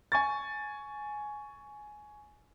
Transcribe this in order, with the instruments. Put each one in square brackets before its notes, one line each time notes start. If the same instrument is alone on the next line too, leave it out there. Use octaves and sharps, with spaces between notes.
[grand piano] G#5 C#6 A6